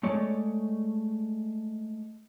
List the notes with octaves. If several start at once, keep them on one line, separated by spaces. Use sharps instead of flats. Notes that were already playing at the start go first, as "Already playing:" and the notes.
G#3 A3 C#5 D5